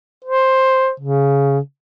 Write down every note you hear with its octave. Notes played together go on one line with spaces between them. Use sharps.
C5
C#3